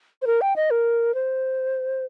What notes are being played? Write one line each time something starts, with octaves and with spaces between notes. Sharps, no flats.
C5
A#4
G5
D#5
A#4
C5